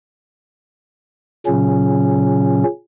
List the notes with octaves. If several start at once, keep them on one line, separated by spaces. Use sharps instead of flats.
A#2 C#3 F#3 C#4